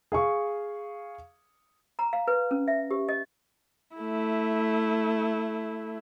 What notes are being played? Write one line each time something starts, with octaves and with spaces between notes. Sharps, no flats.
G#4 F5 C#6
A#5
F5
B4
C#4
E5
G4
D#5
A3 E4